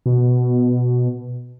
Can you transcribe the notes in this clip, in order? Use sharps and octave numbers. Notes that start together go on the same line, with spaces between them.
B2